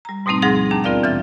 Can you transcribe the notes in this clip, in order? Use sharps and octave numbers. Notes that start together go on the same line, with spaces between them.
G3 A#5
G#2 B2 G3 A3 C4 D#4
D2 G#2 F3 D#4 G#4 A#6
D#2 D4 A5 A#5
B3 C4 F4 A#4 D5 F5
A#2 E3 E5 F6 A6